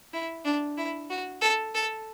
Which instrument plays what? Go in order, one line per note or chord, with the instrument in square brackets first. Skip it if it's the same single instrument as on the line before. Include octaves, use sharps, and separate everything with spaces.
[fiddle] E4
D4
E4
F#4
A4
A4